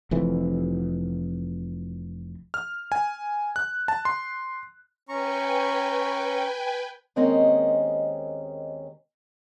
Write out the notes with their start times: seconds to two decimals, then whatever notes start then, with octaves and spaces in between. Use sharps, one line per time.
0.11 F1 F2 E3
2.54 F6
2.92 G#5
3.56 F#6
3.88 A5
4.05 C6
5.09 C#4 B4 G5 G#5 A#5 C#6
7.16 D#2 G#3 C4 C#4 A#4 D#5